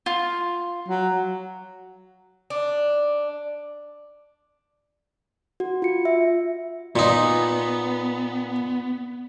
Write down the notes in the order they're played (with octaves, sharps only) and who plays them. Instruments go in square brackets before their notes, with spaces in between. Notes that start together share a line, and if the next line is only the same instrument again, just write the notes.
[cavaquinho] F4
[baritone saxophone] F#3
[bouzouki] D4
[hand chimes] F#4
F4 C#7
E5
[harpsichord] A#2 D#4 [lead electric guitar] B3